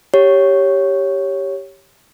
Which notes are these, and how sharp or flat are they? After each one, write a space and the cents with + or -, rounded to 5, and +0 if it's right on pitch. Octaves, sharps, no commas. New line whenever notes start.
G4 +0 C#5 +0